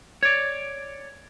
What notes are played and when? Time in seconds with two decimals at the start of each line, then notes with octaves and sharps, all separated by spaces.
0.23 C#5 D5